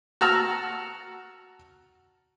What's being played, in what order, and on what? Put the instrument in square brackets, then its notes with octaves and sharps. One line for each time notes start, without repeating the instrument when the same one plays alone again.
[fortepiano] F#4 A5 A#5 E6 F6